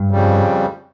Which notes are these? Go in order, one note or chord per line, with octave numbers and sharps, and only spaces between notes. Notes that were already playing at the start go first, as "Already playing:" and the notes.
Already playing: G2
F2 C#3 G3